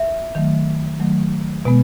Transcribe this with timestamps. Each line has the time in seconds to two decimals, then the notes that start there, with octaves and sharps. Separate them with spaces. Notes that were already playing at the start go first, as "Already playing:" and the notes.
Already playing: E5
0.35 D#3 F#3 A3
1.00 D#3 F#3 A3
1.65 B2 G#3 B3